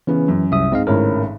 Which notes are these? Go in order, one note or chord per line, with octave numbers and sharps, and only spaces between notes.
C#3 E3 B3 C#4
F#2
C2 E5 D#6
G#2 C4 D#5 F5
G#1 A2 C#3 A#4 C#5